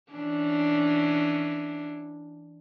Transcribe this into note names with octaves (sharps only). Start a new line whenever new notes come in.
E3 C#4 D4